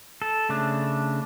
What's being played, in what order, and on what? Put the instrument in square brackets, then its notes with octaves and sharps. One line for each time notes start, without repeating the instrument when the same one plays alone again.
[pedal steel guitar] A4
C#3 A3 D4